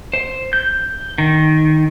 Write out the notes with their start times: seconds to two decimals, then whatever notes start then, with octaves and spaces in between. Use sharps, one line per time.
0.13 C5
0.53 G6
1.18 D#3